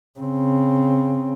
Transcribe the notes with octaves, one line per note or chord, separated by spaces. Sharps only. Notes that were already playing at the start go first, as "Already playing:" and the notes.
C#3 C4